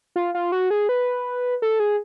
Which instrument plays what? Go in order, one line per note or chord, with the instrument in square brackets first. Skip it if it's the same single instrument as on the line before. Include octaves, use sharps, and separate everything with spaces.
[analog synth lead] F4
F4
F#4
G#4
B4
A4
G#4